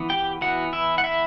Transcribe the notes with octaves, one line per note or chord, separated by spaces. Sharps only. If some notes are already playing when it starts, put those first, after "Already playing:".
Already playing: E3 B3
G4 G5
E3 B3 F#4 F#5
E4 E5
F#5
E4 E5